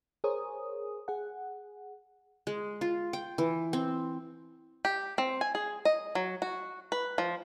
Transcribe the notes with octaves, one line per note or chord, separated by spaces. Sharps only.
G#4 A#4 C5 C#5 D#6
G#4 F#5
G#3
F4
G5
E3
C4
G4
C4
G#5
G#4
D#5
F#3
F#4
B4
F3